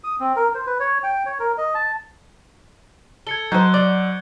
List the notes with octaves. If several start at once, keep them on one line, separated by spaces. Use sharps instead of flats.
D#6
C4
A#4
C5
B4
C#5
G5
C#5
A#4
D#5
A5
A4 G#6 C#7 G7
F#3 D#4 C5 F#6 G6
D5